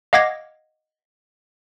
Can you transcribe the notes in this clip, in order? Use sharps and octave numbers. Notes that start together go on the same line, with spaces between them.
D#5 F5 F#5 D6 G#6 A#6